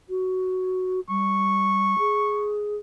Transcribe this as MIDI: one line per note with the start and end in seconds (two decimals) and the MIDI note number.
0.10 1.00 66
1.09 1.95 55
1.09 2.51 85
1.99 2.77 68